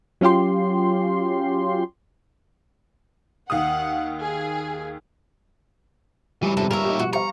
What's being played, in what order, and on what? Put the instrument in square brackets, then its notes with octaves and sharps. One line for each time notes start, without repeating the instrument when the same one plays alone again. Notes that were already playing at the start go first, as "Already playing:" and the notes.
[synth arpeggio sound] F#3 C#4 F4 G4 C6
[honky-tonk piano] D#2 F5 D#6 [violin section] F#5
[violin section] G#4
[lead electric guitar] E3 F#3 [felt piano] G3
[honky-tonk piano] G1 F2 G#2 [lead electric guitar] C3 [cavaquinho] A4
[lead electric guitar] A#2 E5 [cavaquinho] A#4 C#5
[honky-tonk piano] D#4 G4
[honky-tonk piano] B2 F3 [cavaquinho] F#4
[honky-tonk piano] G4 C5 F5 [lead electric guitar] A#5 [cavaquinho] C#6